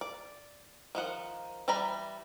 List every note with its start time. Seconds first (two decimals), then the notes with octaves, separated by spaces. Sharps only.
0.01 D5
0.95 D#3 F3 F#5
1.68 E3 G3 D5 A#5 B5